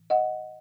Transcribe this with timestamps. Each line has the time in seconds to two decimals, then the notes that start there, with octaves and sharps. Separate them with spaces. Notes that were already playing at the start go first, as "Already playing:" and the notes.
Already playing: A2 E3
0.10 D#5 F#5